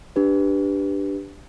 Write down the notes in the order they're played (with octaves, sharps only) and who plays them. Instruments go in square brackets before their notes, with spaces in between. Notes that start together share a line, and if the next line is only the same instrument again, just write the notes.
[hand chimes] D4 G4 B4